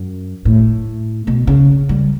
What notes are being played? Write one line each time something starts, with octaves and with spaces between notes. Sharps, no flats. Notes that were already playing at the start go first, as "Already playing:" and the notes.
Already playing: F#2
A2
B2
C#3
G3